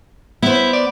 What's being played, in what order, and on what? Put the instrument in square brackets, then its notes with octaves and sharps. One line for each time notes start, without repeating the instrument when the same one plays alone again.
[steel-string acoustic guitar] B3 C5 [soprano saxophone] E4
[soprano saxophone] D5